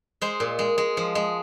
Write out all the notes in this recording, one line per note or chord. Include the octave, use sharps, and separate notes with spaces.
G#3 C5
A#2
G#3
G#3
F3
G#3